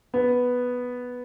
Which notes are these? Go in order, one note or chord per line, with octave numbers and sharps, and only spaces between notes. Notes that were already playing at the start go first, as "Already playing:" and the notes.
B3